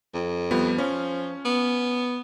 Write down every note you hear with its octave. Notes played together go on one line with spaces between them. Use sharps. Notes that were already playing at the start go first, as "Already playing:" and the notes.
F2
F3 G3 B3
F3 C#4
B3